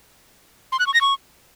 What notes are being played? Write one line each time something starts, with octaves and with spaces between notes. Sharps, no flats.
C6
F#6
C#6
A#6
C#6